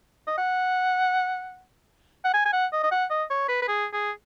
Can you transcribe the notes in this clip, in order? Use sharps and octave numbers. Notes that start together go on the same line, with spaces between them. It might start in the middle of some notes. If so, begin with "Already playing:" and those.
D#5
F#5
F#5
G#5
G#5
F#5
D#5
D#5
F#5
D#5
C#5
B4
B4
G#4
G#4